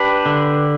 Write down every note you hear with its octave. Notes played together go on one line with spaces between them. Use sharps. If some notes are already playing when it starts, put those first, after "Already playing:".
Already playing: D4 G4 B4
D3